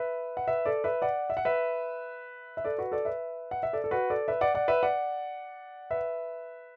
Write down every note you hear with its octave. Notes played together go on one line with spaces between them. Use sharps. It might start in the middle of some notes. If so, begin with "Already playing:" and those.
Already playing: B4 E5
F#5
B4 E5
A4 D5
B4 E5
D5 F#5
E5
F#5
B4 E5
E5
A4 D5
F#4 B4
A4 D5
B4 E5
F#5
E5
A4 D5
A4
F#4 B4
A4 D5
B4 E5
D5 F#5
D5 F#5
B4 E5
D5 F#5
B4 E5